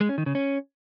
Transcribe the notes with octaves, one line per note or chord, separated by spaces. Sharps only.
G#3
C#4
D#3
C#3
C#4